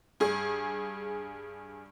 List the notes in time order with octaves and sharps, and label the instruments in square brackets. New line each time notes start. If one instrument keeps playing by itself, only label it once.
[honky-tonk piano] G2 G#4